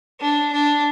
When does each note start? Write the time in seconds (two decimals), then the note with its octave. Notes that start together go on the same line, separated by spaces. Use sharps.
0.21 D4
0.53 D4